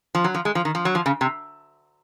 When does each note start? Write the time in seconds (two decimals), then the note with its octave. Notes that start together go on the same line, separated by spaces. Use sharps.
0.15 F3
0.24 F#3
0.34 F3
0.45 G#3
0.55 F3
0.65 D#3
0.75 F3
0.85 F#3
0.95 F3
1.06 C#3
1.21 C3